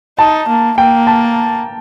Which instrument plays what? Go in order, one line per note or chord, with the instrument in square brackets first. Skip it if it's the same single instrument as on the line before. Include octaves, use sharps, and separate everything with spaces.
[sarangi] D#4 [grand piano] A5
[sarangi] A#3
[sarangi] A#3 [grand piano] G5
[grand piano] A5